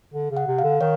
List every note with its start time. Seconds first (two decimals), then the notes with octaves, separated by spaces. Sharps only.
0.14 D3
0.31 C#3
0.37 F#5
0.47 C3
0.59 F5
0.64 D3
0.81 D#3 C#5